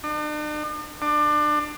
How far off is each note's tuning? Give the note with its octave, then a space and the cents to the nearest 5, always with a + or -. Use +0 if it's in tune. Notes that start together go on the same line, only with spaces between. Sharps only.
D4 +45
D4 +25